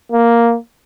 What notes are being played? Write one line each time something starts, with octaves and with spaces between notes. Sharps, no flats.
A#3